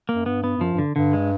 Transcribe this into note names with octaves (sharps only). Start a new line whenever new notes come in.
A#3
F#2
G2 B3
B3
G2
F#2 F3
G2
D3
G2 D3
G#3